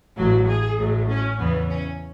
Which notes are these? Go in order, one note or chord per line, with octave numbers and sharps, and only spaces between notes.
A1 A2 F#3
G#4
A1 A2 F#3
C#4
E2 C#3 E3 B3
C#4